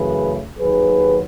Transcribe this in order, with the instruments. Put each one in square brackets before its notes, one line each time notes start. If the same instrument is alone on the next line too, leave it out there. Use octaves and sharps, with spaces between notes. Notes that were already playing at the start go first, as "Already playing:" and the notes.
Already playing: [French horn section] F#2 C#3 E3 A3 G#4 B4
D#2 D#3 F#3 G#4 B4